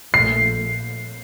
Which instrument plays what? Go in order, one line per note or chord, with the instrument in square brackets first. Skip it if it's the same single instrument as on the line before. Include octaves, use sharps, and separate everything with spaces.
[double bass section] A#1 A#2 A3 [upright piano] C7